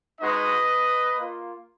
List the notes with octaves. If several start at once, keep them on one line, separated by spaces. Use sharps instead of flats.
G#3 D#4 F#4 B4 D#5
A#3 F4